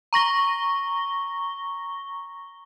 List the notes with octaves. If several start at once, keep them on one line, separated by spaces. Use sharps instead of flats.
A#5 C#6 A#6 G7